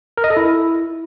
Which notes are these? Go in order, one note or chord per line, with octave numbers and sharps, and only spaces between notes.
A#4
D#5
A4
E4